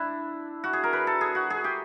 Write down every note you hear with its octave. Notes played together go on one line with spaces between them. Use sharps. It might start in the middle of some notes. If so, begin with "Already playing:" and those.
Already playing: D4 E4
F#4
G#4
A#4
B4
A4
G#4
F#4
G#4
G4